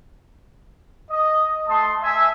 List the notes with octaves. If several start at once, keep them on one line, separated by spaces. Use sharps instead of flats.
D#5
A3 A5 C6 D#6
E5 G#5